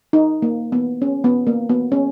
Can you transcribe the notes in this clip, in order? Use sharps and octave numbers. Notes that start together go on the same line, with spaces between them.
D#4
A#3
B3
C#4
B3
A#3
B3
C#4